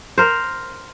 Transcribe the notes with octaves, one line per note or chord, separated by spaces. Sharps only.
A#4 C5